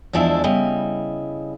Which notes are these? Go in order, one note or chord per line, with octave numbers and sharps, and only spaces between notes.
E2 F3 G#3 D4 E4 E5
C#3 G3 E4 D#5